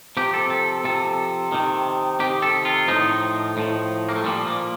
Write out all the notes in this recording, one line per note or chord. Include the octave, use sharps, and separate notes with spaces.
C3 F3 G4
A4
A4
C3 F3 A4
C3 D#3
C3 D#3 G4
A4
F4
A2 F3 D#4
A2 F3
A#3
A3
A#2 F3 G3
A#3